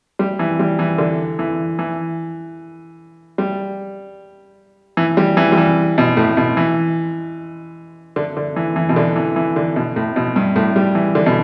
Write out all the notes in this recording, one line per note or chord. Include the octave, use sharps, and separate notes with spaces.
G3
E3
G3
E3
D3
E3
E3
G3
E3
G3
E3
G3
E3
B2
A2
B2
E3
D3
D3
E3
E3
B2
D3
E3
E3
D3
B2
A2
B2
G2
A2
G3
E3
D3
B2